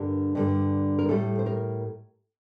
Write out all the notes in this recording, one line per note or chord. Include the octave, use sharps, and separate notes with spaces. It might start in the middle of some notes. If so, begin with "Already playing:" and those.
Already playing: G2 D3 G3 A#4
G2 D3 G3
A#4
A2 G3 A4
C5
A#4